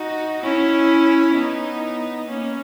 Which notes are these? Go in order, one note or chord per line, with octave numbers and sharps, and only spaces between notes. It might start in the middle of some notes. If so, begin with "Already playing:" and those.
Already playing: D#4 F#4
C#4 E4
B3 D#4
A#3 C#4